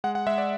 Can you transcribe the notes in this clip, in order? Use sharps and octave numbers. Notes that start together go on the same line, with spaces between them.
G#3 F#5
F#5
G#3 E5
D5